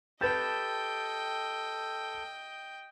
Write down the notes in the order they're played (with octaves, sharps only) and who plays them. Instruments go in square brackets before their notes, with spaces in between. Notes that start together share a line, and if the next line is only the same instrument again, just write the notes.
[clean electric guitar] G4 A5 [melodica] A4 [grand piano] B4 G6 [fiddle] D#5 G5